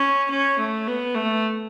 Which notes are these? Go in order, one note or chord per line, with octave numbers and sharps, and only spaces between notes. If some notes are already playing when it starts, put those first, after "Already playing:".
Already playing: C#4
C#4
A3
B3
A3